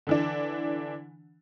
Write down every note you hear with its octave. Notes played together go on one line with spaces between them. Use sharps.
D3 E3 D4